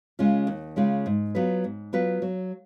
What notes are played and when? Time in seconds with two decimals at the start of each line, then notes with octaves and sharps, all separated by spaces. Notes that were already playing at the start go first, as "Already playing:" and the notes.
0.19 C#3 G#3 C#4 F4
0.47 D#2
0.76 C#3 G#3 C#4 F4
1.06 G#2
1.35 F#3 B3 F4 B4
1.64 G#2
1.93 F#3 B3 F4 B4
2.22 F#3